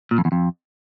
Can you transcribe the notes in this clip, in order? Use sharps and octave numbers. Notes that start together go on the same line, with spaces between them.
A#2
F2
E2
F2